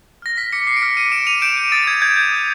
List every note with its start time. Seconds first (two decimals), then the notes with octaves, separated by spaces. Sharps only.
0.22 F6 A#6
0.37 F6 B6
0.53 D6 B6 C#7
0.67 D6 C7
0.76 D7
0.82 F6 B6 C#7
0.97 F6 C#7 D#7
1.12 D6 D7 E7
1.27 D6 D#7 F7
1.42 G6 D7 E7
1.57 G6
1.72 D#6 A6
1.87 D#6 G#6
2.02 G6 G#6
2.17 G6
2.32 D#6